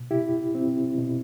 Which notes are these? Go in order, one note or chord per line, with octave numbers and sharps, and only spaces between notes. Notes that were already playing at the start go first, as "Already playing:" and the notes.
Already playing: B2
C3 E4 G4
C4
B2